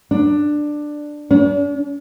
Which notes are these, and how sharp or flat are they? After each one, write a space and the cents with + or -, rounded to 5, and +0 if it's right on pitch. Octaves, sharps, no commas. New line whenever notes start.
D4 +10
D4 -40